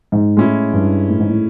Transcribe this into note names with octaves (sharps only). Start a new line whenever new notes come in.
G#2
A2 G#3 C#4 E4
G2
A2
G#2
A2